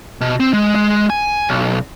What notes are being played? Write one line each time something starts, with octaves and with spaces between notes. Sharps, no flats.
B2
C4
G#3
G#3
G#5
B1